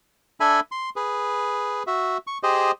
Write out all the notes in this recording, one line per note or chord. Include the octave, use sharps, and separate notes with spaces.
D4 A4 E5 G#5 B5
C6
G#4 B4
F#4 E5
C#6
G4 G#4 C5 D#5